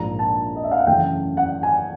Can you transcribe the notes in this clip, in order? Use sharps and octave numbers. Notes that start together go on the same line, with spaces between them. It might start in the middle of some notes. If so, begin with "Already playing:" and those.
Already playing: A#1 G#2 F3 A#3 A#5
A5
D#5
E5
F5
F#5
F#1 F#2 C#3 E3 A3 G5
F#5
G#5